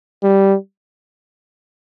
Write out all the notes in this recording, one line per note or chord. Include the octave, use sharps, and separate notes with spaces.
G3